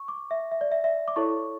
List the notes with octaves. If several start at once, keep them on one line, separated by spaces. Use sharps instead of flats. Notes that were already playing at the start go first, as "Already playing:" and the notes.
Already playing: C#6
D6
E5
E5
D5
E5
E5
D6
E4 A4 C#5 C#6